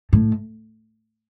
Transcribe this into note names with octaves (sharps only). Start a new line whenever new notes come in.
A2